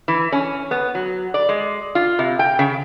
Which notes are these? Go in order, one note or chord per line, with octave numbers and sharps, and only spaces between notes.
E3
C#4
B3
F#3
D5
G#3
F4
C3
G5
C#3